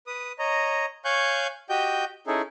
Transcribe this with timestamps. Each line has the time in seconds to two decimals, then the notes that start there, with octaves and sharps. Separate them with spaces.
0.07 B4 D#6
0.39 C#5 D#5 A#5
1.05 C#5 F5 G#5 C#6 F#6 G6
1.70 F#4 G4 D#5 G5 G6
2.27 C#4 D#4 E4 G#4 A4